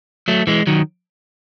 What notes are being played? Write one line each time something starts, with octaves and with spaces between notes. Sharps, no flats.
F#3 A3
E3 G#3
D#3 F#3